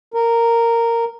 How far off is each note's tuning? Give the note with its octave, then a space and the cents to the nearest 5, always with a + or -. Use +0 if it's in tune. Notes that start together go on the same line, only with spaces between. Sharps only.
A#4 -10